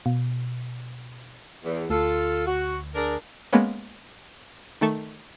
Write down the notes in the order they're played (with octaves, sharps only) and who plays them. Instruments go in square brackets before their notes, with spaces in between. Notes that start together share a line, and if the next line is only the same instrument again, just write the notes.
[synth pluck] B2
[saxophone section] E2
[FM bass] D2 [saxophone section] F4 A4
[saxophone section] F#4
D4 G#4 A#4
[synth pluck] G#3 A#3 B3 C#4
D#3 A3 A5 C#6